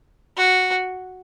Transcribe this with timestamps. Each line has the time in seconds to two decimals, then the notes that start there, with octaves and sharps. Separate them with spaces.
0.37 F#4